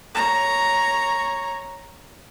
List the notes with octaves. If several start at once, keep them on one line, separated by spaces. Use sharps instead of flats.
C#5 A#5